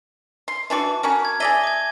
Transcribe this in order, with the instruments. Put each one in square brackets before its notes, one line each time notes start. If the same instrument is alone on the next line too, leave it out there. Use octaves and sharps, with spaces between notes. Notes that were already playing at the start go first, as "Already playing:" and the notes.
[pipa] C6
[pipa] E3 D4 F#4 [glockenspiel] A5 D6
[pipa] C#4 F#4 A#4
[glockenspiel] G#6
[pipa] G#4 D5 E5 [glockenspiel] A#6 D#7 G7
[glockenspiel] D6 G#6